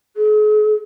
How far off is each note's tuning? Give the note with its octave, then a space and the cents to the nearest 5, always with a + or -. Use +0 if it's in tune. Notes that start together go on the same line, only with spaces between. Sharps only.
G#4 +40